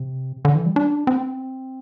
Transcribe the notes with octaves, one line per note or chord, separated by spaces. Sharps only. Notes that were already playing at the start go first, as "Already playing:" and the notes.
Already playing: C3
D3
E3
G3
D4
C4